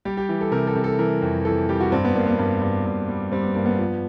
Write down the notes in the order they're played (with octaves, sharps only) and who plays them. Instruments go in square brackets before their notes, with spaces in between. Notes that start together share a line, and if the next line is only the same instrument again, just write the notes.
[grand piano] G3 G4
G4
E3
A4
C3 A#4
A4
C3
A4
E3 A#4
F2
E3 A4
G3 G4
F#4
G2 C4
B3
G2 A#3
B3
G2 A#3
G2
G2
G3
G3 C4
B3
G2 A#3
B3
F3